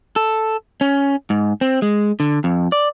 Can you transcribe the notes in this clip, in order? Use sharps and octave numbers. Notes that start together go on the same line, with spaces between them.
A4
C#4
G#2
C4
G#3
D3
F2
D5